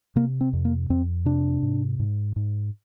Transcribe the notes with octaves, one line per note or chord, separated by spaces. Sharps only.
C3 A#3
C4
F2
A#3
F2 C4
C3 D4
G#2
G#2
G#2